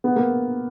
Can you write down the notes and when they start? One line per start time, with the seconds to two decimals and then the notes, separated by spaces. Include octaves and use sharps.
0.04 B3
0.16 A#3